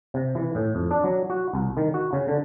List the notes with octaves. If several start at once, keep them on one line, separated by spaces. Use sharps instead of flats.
C3
E3
A2
F2
D4
F#3
F#4
C2
D#3
F#4
C#3
D3